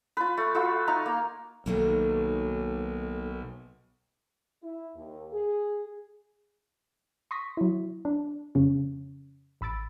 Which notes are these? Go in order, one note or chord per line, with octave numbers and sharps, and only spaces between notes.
F4 B4
A3
F4 F#4 A4 E5
D#4 F5 A#5
A#3
B1 D#3 A3 A#3
E4
D#2
G#4
C6 C#6 D#6 A#6 B6
F#3 E4
D4
F2 C#3 C#4
A1 B5 E6 A6 D7